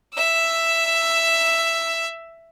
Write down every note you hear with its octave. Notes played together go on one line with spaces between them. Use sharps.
E5 E6